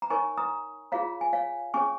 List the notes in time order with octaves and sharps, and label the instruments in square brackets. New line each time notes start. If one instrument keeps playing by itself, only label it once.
[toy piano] A#5
D#4 A#4 C#5 G#5 C#6
A#5 D#6
F4 G#4 C#5 F5 A#5
G#5
C#5 F5
C#4 G#4 C#5 G#5 C#6